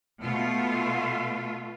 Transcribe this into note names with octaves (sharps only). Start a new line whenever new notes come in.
B2 A3 F4